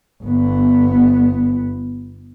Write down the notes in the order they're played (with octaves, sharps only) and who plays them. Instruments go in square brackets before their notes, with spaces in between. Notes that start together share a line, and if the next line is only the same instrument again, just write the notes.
[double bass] G1 B3